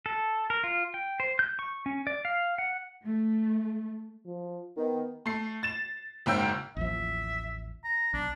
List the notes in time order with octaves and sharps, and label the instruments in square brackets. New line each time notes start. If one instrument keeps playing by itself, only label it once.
[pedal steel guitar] A4
A#4
F4
G5
C5
G6
C#6
C#4
D5
F5
F#5
[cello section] A3
[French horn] F3
[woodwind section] D#3 [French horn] B3
[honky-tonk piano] A3 C7
A6 E7
F#1 G#2 C#3 G5 E6 G6
[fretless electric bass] A1 D#2 F3 [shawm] E5
[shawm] A#5
[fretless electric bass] B1 [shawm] D4